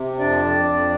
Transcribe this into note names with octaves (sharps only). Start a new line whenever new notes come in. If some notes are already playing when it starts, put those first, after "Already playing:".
Already playing: C3
F2 D4 D5
F2